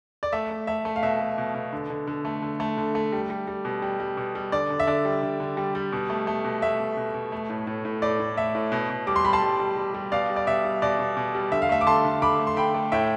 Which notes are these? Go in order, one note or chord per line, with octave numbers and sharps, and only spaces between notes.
D5
A3 E5
A3
A3 E5
A3
F5
B2 E5
A3
B2
B2
D3
D3
D3
A3
D3
A3
D3
A3
G3
G3
G3
B2
G3
G3
B2
G3
D3 D5
D3
E5
D3 D5
G3
D3
D3
G3
G3
B2
A3
A3
B2
A3 E5
B2
B2
B2
A3
A2
A2
A2
A2 D5
A2
A3 E5
A2
B2
B2
G3 D6
C6
G3 B5
A5 C6
G3
G3
G3
G3
B2 D5 F5
G3
D5
B2 E5
G3
B2 D5
B2
B2
G3
D3 E5
F5
A3 E5
D6
D3 A5 C6
D3
D3 B5 D6
A3
C6
D3 G5 B5
A3
A2 E5 G5